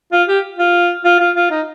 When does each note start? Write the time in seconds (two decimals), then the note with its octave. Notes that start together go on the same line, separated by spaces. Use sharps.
0.13 F4
0.28 G4
0.59 F4
1.05 F4
1.20 F4
1.36 F4
1.51 D#4